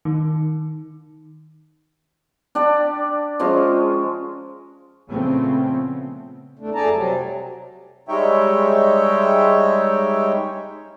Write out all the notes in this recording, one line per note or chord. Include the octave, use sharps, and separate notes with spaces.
D#3
D4 G4 D5
F3 G#3 C#4 A#5
A#2 C#3 F3 A3 B3 C4
E2 A3 D4
F2 A3 G#4 D5 A5 A#5
C3 F#3 G3
G3 G#3 D#4 C#5 E5 G5